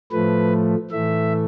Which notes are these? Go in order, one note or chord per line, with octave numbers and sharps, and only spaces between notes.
A2 F3 A3 B4
A2 E3 A3 E5